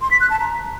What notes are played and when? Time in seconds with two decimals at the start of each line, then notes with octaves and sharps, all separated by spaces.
0.01 C6
0.11 B6
0.21 F#6
0.30 A5
0.40 A#5